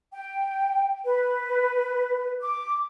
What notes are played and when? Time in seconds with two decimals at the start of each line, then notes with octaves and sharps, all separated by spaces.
0.13 G5
1.05 B4
2.42 D6